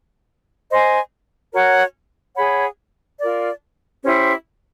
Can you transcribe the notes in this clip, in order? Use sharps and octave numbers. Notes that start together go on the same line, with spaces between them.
C5 D#5 G#5 C6
F#4 A#4 C#5 F#5
G#4 C#5 F#5 B5
F4 A#4 D5
C#4 E4 G4 C5